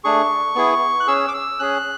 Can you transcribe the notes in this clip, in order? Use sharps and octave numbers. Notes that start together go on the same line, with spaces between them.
A3 D4 G#4 C#6
B3 E4 G#4
F#6
C#4 G#4 E6
D6
E6
C#4 G#4 F#6